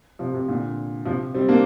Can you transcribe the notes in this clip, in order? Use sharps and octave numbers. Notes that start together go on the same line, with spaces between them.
C3 F3
C3
A#2 D3
C3 F3
G3 C4
A#3 D4